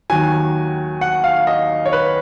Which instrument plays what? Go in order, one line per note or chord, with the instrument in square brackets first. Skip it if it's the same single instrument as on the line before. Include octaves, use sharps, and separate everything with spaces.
[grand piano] D#2 D#3 F#3 G#5
F#5
F5
D#5
C#5
B4